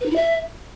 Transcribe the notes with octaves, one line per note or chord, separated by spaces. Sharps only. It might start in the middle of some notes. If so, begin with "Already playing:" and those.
B4
D#4
E4
E5